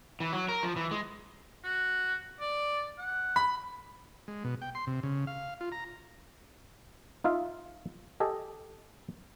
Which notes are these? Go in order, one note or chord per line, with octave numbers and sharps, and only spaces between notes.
E3
F#3
A#4
F3
E3
G#3
F#4
D5
F#5
B5
G#3
B2
G5
C6
C3
C#3
F5
F4
A#5
D#4 F4 E5 F5
G4 A4 D#5 G#5